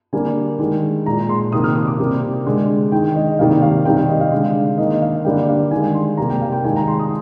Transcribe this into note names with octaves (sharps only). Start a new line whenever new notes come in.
D3 G3 A#3 G#5
D#3 G#3
A#2 G#3 A#5
C6
C3 D#3 A#3 D#6
F6
D#6
D6
C3 G3 A#3
D3 G#3
D#3 G#3 G5
D#5
C3 D#3 G3 A#3 F5
F5
C3 D#3 G3 G5
F5
D#5
F5
D3 G#3
D#3 A#3 D#5
F5
D3 G3 A#3 G5
F5
D#3 G#3 G#5
C6
C3 G3 A#3 A#5
G5
F5
G5
D#3 G#3 G#5
A#5
C6
D#6